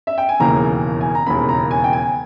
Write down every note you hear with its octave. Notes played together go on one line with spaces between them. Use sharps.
E5
G5
G#5
E1 D#2 C#3 E3 A#3 A#5
G#5
A#5
E1 D#2 C#3 E3 A#3 B5
A#5
G#5
G5
G#5